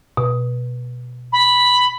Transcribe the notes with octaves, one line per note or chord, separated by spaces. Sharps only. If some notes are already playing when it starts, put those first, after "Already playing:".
B2
B5